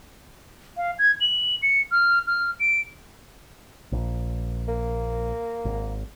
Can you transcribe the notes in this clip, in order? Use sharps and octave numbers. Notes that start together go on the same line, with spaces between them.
F5
G#6
F#7
C#7
F6
F6
D7
A#1
A#3
G#1